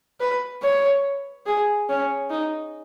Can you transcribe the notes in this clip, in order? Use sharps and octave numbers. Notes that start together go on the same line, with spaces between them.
B4
C#5
G#4
C#4
D#4